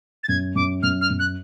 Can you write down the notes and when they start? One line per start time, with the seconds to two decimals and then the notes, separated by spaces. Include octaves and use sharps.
0.23 A6
0.28 F#2 G#6
0.55 F#2 D6
0.83 F#2 F6
1.01 F6
1.10 F#2
1.19 F#6